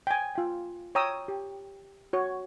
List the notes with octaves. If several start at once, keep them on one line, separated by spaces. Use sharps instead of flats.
G5 G#5
F4 G5
C#5 G5 A#5 D#6 E6
G4
F#4 C#5